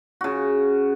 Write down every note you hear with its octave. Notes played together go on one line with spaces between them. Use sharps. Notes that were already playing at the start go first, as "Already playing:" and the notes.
C#3 F#4